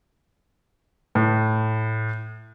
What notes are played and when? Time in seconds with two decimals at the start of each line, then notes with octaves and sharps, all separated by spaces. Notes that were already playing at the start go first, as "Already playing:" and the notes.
1.15 A2